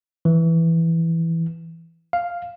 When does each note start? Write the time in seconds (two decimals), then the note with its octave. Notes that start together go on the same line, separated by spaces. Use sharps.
0.25 E3
2.13 F5